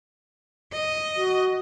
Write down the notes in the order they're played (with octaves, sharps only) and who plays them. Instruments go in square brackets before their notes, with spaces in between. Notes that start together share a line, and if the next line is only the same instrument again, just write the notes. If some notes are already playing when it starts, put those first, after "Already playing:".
[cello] D#5
[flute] F#4